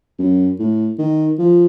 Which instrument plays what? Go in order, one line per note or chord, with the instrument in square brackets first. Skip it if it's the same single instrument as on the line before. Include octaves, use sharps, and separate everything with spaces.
[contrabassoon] F#2
A2
D#3
F3